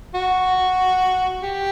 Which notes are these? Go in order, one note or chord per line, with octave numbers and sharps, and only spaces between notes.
F#4
G4